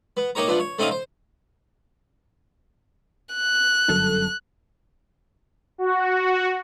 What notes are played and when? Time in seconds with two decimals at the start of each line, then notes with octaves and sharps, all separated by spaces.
0.17 B3
0.35 A#3 D#4 G4 C#5 A#5
0.48 C3 F3 B3 D4
0.60 C#5
0.79 A3 C4 C#4 D#4 D#5 F5
0.91 C5
3.35 F#6
3.88 G1 F#2 A4
5.78 F#4